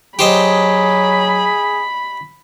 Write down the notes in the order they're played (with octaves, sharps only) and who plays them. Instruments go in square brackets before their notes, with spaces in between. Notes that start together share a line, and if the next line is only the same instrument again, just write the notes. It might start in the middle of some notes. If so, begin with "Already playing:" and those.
[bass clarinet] F#3 [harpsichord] G4 C5 D#5 [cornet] G#4 [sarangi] B5